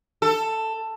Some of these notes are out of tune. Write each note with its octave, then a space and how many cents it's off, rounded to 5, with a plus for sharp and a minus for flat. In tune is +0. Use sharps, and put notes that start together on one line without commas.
A4 +10